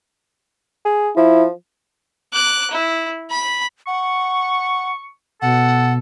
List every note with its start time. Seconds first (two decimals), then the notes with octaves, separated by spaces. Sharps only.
0.85 G#4
1.17 F3 E4
2.34 D6 F#6
2.71 E4
3.31 B5
3.87 F#5 C#6
5.42 B2 A4 F#5